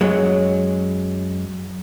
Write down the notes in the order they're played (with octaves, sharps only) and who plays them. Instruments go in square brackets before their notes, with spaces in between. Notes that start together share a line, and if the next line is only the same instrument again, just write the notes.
[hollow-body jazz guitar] F#2 F#3 G#3